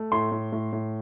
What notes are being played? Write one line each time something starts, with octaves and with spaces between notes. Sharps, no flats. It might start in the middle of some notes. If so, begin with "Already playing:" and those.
Already playing: A3
A2 C6
A2
A2
A2